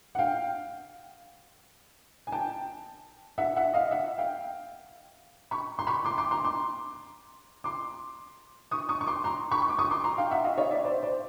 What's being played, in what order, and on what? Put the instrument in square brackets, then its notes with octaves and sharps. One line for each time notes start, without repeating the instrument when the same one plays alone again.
[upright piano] F#5
F5 G5
G#5
G5 A5
E5 F#5
E5 F#5
D#5 F5
E5 F#5
F5 G5
B5 C#6
C6
B5 C#6
C6 D6
C6 D6
A#5 C6
C6 D6
C6 D6
C#6 D#6
C#6 D#6
C#6
C6 D6
A#5 C6
B5 C#6
C#6
D6
C#6 D#6
C6 D6
A#5 C6
F5 G5
E5 F#5
D#5 F5
C#5 D#5
D5 E5
C5 D5
C5 D5